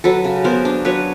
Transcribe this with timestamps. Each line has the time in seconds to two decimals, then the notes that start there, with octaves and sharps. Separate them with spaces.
0.04 F#3 A4 B4
0.24 C#3
0.44 B3 A#4 C5
0.65 D4
0.85 F#3 B4 C#5